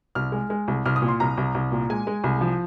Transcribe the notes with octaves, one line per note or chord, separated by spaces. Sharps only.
C2 F6
G#3
G#3
C2
C2 F6
D#6
A#2
C6
C2 A#5
C2
C2
A#2
G#3 G#5
G#3
C2
F3